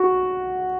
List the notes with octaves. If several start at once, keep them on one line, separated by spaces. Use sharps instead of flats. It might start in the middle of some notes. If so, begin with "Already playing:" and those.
Already playing: F#4